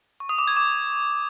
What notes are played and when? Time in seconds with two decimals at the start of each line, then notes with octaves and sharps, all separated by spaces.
0.20 C#6
0.29 D#6
0.38 D6
0.48 G#6
0.57 D6